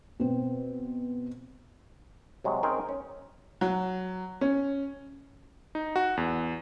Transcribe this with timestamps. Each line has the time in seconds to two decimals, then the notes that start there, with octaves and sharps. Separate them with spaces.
0.20 B2 C4
2.44 C3 F#3 G#3
2.63 C4 C#4 D#4 G#4 A#4 G5
2.89 C#4
3.61 F#3
4.41 C#4
5.75 D#4
5.96 F#4
6.17 E2